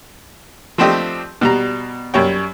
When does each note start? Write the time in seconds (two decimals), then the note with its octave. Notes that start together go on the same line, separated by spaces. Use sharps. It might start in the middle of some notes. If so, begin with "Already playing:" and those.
0.78 F3 A3 C4 D4 G4 D#5
1.41 B2 G3 A#5
2.14 F#2 G3 C#5 G5